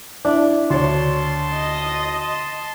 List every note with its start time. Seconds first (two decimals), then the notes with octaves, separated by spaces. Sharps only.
0.25 D4 E4
0.70 D2 C#5 A5 C6
1.55 D#5